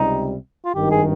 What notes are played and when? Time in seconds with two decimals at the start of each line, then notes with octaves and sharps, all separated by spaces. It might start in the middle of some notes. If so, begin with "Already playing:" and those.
Already playing: C#2 C3 G3 D#4
0.65 F4
0.75 G#1 G2 D#3 G4
0.91 G#4